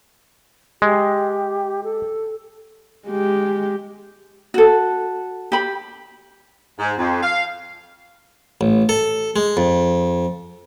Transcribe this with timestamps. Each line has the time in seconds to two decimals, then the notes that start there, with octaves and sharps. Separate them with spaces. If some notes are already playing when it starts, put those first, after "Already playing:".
0.82 G#3 G4
1.84 A4
3.08 G#3 G4
4.54 F#4 A4
5.52 G4 B5
6.79 G#2
6.98 F2
7.23 F5
8.61 A1
8.89 A4
9.36 G#3
9.57 F2